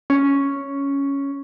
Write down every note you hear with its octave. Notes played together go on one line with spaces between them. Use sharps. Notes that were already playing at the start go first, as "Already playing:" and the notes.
C#4